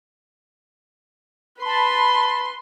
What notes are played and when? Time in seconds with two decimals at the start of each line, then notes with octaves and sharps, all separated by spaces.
1.62 B4 A5 B5 C6